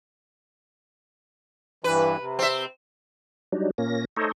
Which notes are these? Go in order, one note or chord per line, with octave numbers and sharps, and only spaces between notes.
G2 E3 B4
C3
C4 E5
F#3 G3 D4 D#4
A#2 A#3 C#4 A#6
A3 D#4 A4 C5 C#5 D#5